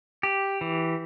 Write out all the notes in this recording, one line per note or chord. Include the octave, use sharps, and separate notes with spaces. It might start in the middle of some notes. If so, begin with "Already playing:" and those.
G4
E3